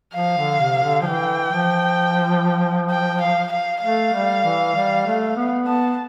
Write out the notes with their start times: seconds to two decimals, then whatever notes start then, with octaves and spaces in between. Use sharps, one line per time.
0.14 F3 F5
0.37 D3
0.60 C3
0.83 D3
1.02 F3
1.06 E3 G5
1.52 F3
2.90 G5
3.22 F5
3.53 F5
3.83 A3 F5
4.14 G3
4.45 E3
4.75 G3
5.06 A3
5.36 B3
5.67 B3 A5